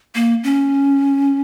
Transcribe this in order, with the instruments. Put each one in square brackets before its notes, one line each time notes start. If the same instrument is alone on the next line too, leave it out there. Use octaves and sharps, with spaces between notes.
[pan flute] A#3
C#4